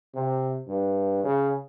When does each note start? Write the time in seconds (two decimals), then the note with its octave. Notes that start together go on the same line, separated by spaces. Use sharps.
0.15 C3
0.68 G2
1.24 C#3